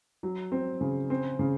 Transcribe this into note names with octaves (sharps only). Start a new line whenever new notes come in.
F#3
C4
C#3
C4
C#3